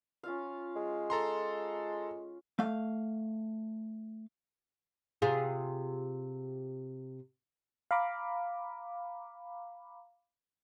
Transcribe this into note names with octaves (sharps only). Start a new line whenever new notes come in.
C#4 F4 F5
G#3
A4 A#5 C6
A3 F5
C3 F4 G#4
F5 A#5 B5 D6